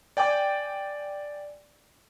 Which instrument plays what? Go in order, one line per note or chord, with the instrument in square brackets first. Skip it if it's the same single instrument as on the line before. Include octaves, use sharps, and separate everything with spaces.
[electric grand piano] D5 G5 G#5 D6